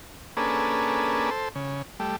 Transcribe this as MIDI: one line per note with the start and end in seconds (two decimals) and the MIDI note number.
0.37 1.30 58
0.37 1.30 61
0.37 1.30 62
0.37 1.30 68
0.37 1.30 69
0.37 1.30 71
1.31 1.49 69
1.31 1.49 72
1.55 1.82 49
2.00 2.16 55
2.00 2.16 57